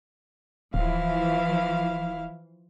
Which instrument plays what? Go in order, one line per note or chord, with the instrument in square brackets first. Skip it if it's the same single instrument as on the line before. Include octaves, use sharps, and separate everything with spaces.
[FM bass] D1 [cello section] E3 F3 [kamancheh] E4 F5